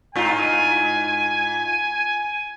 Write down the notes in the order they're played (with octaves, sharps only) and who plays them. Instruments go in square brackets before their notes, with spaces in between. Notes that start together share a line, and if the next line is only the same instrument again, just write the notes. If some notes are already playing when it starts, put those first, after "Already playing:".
[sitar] G#2 D#4 F4 [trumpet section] G#5